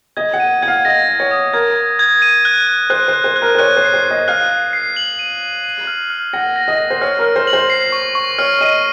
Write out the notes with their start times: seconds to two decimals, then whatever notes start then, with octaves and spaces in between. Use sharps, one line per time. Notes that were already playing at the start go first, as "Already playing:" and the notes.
0.17 D#5 G#6
0.33 F#5
0.40 D#7
0.62 F#5 G#6
0.68 F5
0.85 D#5 A#6
1.08 A#6
1.20 C#5
1.31 D#6
1.53 A#4 G#6
1.76 G#6
1.99 G#6
2.22 D#7
2.45 F#6
2.67 F#6
2.90 C5 F#6
3.08 C5
3.13 F#6
3.24 C5
3.36 F#6
3.42 A#4
3.55 C5
3.58 C#5 F#6
3.77 C5
3.82 C7
3.94 C5
4.04 F#6
4.10 D#5
4.28 F5 F#6
4.50 F#6
4.73 C7
4.96 F#7
5.19 D#7
5.42 D#7
5.64 D#7
5.87 F6
6.10 F6
6.33 F#5 A#6
6.56 A#6
6.68 D#5
6.79 A#6
6.90 C5
7.01 C#5 F6
7.19 A#4
7.24 F6
7.36 C5
7.47 F#7
7.53 C5
7.70 C7
7.92 C#6
8.15 C#6
8.38 C#5 F6
8.61 D#5 D#7